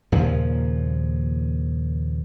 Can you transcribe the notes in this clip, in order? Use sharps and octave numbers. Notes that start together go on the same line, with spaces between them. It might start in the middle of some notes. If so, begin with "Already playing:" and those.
D#2 A#2 C#3 F3